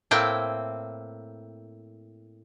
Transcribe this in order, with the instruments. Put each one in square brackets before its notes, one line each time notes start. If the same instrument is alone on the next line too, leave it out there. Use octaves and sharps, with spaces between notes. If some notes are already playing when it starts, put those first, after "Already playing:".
[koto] A2 A#3 C4 E4 G5